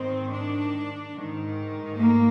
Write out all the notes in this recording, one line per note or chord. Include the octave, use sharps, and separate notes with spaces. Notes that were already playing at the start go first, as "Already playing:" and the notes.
Already playing: G#2 D#3 C4
D4
G#2 D#3
A#3